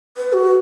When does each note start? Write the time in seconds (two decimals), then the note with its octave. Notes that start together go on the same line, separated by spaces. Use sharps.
0.17 B4
0.33 F#4